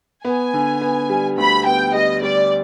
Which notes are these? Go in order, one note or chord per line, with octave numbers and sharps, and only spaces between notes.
B3 G#5
D3
B3
G3
D2 B5
B3 G5
G3 D#5
G3 D5